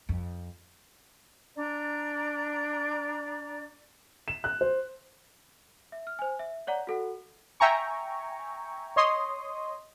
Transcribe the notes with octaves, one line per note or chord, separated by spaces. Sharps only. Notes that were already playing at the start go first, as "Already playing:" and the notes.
F2
D4 D5 A#5
E7
F#6
C5
E5
F6
C5 G#5
E5
C#5 D5 F#5 A#5
F#4 A4 F#5
E5 G5 G#5 A#5 C#6
C#5 D#5 C6 D#6